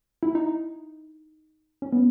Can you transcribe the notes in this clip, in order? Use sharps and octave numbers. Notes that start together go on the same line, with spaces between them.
E4
D#4
C#4
B3